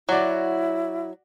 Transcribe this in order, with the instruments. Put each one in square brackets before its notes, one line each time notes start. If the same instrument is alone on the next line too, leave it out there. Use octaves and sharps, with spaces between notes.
[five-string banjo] F#3 [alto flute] E4 [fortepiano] F#4 D5